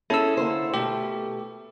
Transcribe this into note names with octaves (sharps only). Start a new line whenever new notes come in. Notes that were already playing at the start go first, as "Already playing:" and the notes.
C#4 E4 G#4 A4 E6
D3 A#3 C5
B2 A3 G4